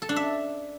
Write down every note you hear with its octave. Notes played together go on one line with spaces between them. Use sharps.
A4
D4
E5